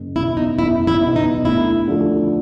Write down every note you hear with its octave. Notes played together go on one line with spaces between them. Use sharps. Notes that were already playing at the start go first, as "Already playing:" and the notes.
Already playing: F#1
E2 B2 E4
D#4
F#1 E4
E4
E2 B2
D#4
D2 E4
D3 F3 A3